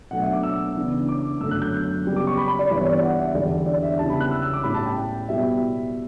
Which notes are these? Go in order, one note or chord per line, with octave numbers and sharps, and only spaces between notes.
B2 F#3 A3 D4 F#5
E5
D6
E6
C#3 E3 B3 D4
D6
F#2 D3 F#3 A3 E6
F#6
G6
C#3 G3 B3
D6
C#6
B5
B5
D5
G2 E3 G3 B3 E4 D5
C#5
D5
F#5
E5
E2 D3 G3 D4 D5
D5
E5
C#3 G3 B3 E4 A5
B5
F#6
E6
E6
D6
A2 G3 C#4 E4 B5
A5
G5
B2 G3 B3 E4 E5